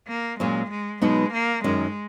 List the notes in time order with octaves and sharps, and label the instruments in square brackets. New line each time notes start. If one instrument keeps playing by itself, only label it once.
[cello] A#3
[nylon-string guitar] A#2 F#3 C#4 [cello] G#3
[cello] G#3
[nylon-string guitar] B2 F#3 B3 D#4 [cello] G#3
[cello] A#3
[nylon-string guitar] F#2 D#3 F#3 C#4 [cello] G#3